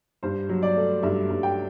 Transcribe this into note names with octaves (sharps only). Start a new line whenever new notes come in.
G2 C5
F#3
D5
A3
G2 E5
G2
G5